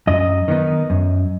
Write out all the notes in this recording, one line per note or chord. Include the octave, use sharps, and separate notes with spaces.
F#2 D#5
D#3 B3 D#4
F#2